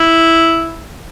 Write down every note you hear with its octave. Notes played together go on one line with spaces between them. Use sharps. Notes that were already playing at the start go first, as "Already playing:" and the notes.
Already playing: E4